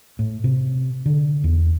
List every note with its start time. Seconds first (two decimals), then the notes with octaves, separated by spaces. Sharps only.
0.19 A2
0.44 C3
1.06 D3
1.44 E2